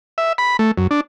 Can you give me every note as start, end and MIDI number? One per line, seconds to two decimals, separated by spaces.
0.18 0.33 76
0.38 0.57 83
0.59 0.71 57
0.78 0.87 42
0.91 1.01 62